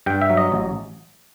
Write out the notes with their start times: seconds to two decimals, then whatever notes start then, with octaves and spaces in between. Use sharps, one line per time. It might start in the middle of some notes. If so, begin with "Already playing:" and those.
0.06 G2 G5
0.22 E5
0.30 F#3
0.37 D#5
0.52 A1